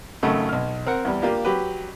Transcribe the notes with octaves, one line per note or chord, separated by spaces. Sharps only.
G#1 F#2 C#3 A3
B1 F6
C4 A#4 F#5
E2 G3
A#3 D4 F4 G4
F#3 G4 B4